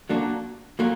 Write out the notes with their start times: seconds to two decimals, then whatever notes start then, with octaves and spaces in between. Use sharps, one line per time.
0.09 A#2 F#3 A#3 D4 F#4
0.79 A#2 F#3 A#3